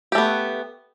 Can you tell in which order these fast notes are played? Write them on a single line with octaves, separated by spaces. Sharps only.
G4 A3 B3